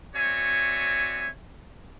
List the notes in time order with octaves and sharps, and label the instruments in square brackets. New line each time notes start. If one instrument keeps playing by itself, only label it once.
[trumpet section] C4 F#4 C#5 D5 E5 G#5